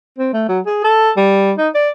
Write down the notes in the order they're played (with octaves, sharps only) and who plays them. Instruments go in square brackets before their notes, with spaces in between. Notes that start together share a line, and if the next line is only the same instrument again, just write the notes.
[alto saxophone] C4
A3
F#3
G#4
A4
G3
D#4
D5